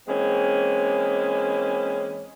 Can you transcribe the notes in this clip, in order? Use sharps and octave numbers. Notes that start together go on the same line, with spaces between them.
E3 G#3 A#3 C4 C#4